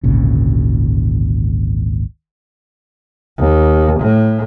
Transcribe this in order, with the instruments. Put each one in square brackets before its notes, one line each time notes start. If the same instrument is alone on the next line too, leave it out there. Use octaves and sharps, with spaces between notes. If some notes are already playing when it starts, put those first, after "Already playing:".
[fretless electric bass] G#1 D2 A#2 C#3
[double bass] D#2
A2